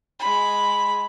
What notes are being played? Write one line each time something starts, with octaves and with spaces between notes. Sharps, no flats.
G#3 B5